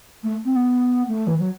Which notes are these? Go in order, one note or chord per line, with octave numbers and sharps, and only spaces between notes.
A3
C4
B3
A3
E3
F#3